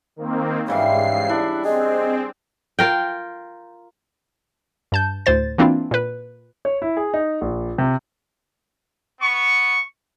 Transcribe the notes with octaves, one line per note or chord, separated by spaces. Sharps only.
D#3 A#3 C4
G#2 C#3 E3 G3 G#3 F5 C7
D4 E4
C4 G#4 D#5
F4 A#4 G5
G2 A5 G6
D2 A2 C5 A6
E3 A#3 C4 D4 E4 F4
A#2 B4
C#5
E4
G#4
D#4
A#1
C3
B3 C#6